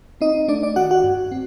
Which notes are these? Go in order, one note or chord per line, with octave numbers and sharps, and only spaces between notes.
C4 D#4 D#5
A3 D4 D5
D4 D5
D#3 F#4 F#5
F#4 F#5
G2
C4